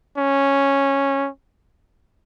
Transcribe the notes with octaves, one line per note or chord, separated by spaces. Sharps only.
C#4